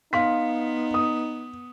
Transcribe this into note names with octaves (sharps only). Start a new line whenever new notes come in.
B3 D#4 F5 C6 B6
D#6